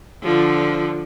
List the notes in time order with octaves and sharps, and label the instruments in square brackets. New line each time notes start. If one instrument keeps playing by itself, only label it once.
[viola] D3 F3